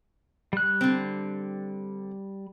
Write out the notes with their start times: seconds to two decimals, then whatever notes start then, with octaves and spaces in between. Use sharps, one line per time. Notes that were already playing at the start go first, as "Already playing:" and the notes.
0.53 G3 F#6
0.81 D3 C4